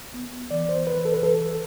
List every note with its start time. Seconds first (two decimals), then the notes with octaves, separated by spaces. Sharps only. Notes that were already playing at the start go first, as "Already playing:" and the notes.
0.14 B3
0.51 E3 D5
0.69 C5
0.87 E3 B4
1.05 A4
1.14 B4
1.23 E3 A4